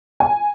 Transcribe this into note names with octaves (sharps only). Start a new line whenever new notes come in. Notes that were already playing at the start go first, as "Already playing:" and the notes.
G#5